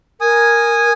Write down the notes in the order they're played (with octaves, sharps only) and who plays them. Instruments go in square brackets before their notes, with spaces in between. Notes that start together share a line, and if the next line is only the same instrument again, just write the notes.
[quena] A#4 [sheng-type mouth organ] G#5 D#6